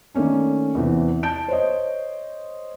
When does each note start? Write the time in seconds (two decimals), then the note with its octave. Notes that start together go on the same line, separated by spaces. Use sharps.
0.14 D#3 A3 A#3 C#4 D4
0.75 E2 C3 E3
1.23 A5 G6 D7
1.48 C5 C#5 D#5